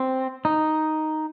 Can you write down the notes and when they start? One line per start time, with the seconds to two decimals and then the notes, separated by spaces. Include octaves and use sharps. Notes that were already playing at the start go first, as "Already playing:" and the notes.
Already playing: C4
0.45 D#4